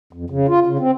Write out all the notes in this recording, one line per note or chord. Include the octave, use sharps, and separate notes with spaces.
F2
C#3
F4
C#3
C4